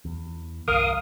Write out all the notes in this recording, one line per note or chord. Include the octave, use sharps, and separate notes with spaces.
E2
G1 C2 A#4 F5 D#6